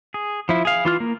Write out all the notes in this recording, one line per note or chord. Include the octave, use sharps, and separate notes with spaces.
G#4
F3 E4
G#4 F5
E3 F4 F6
A#3